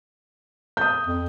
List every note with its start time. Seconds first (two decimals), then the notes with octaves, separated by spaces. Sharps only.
0.77 D#6 G6
1.07 F2